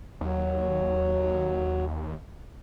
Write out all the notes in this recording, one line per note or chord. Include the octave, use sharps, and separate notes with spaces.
D#2 F#3